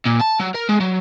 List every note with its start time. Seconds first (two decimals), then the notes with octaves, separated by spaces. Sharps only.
0.05 A#2
0.20 A5
0.40 F#3
0.54 A#4
0.69 G#3
0.80 F#3